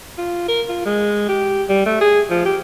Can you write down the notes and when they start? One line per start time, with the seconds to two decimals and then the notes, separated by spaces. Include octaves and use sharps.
0.18 F4
0.48 A#4
0.69 F4
0.85 G#3
1.29 G4
1.69 G3
1.86 A3
2.01 G#4
2.30 F3
2.45 G4